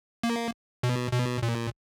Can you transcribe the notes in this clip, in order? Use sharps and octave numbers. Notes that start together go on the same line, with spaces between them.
A#3
B2
B2
A#2